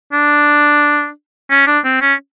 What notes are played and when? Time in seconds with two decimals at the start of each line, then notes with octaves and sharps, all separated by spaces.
0.13 D4
1.50 C#4
1.67 D4
1.85 C4
2.01 C#4